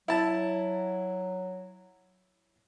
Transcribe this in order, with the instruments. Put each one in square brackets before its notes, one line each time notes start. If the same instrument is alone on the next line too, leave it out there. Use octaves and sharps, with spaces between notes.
[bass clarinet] F#3 [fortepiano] E4 A5